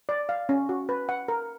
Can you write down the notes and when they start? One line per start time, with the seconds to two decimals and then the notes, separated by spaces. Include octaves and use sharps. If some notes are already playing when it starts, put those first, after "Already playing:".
0.09 D5
0.29 F5
0.49 C#4
0.69 F#4
0.89 B4
1.09 F#5
1.28 A#4